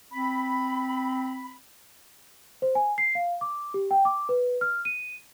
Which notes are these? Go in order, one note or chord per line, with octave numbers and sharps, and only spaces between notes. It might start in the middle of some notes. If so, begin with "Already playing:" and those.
C4 B5
C5
G#5
C7
F5
D6
G4
G5
D6
B4
F6
D#7